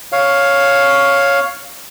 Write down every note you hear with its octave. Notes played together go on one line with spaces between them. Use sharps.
C#5 F5